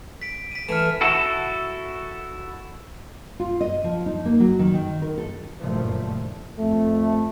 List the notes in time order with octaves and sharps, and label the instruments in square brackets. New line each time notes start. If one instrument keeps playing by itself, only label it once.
[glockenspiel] B6 D7
B6 D#7
[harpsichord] E3 A3 [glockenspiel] F6 E7
[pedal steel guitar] E4 F#4 A4
[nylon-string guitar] F4
D#5
F3
D#4
A#3
F#3
D#3
D#3
A#4
A4
[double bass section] F#1 G2 A#2 D#3 F3 A3
[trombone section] F2 A3